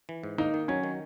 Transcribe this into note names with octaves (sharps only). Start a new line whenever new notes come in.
E3
G#2
A#3 D#4
D#3
F#3 C#4
D#3